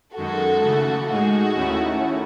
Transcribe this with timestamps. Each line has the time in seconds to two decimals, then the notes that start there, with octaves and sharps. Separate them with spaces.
0.16 F#2 D#3 G#3 F#4 A4
0.63 C#3 E3 A3
1.10 A2 G#3 D#4 F#4 G#4
1.55 D#2 D#3 A3 C#4 E4